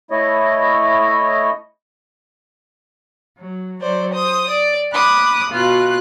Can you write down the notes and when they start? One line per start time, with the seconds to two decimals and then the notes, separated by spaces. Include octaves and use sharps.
0.11 A3 E4 C#5 D#5
3.37 F#3
3.79 F#3 C5 D5
4.11 C5 D#6
4.48 D5
4.92 B5 D6 D#6 F#6
5.49 B2 F4 F#6